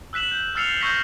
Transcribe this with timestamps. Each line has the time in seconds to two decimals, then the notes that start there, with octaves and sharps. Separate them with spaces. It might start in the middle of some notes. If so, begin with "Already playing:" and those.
0.13 E6 F#6 B6 E7 F#7
0.31 G6
0.55 E6 F6 A6 C7 C#7 F7
0.81 C#6 E6 G6 A#6 B6